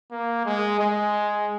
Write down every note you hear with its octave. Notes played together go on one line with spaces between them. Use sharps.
A#3
G#3
G#3